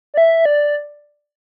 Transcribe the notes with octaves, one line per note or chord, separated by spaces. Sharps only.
D5
E5
D5